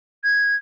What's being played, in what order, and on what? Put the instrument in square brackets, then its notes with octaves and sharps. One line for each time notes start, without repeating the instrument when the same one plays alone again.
[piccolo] G#6